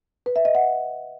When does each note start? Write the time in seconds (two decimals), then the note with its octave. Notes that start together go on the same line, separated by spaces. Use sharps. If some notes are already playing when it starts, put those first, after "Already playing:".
0.26 B4
0.36 E5
0.45 D#5
0.55 F#5